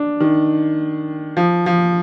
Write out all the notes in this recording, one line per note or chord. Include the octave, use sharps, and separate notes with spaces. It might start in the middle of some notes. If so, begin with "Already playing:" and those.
Already playing: D4
D#3
F3
F3